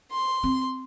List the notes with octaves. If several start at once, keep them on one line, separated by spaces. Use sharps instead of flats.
C6
C4